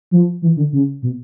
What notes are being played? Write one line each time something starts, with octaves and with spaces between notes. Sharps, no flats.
F3
E3
D3
C#3
B2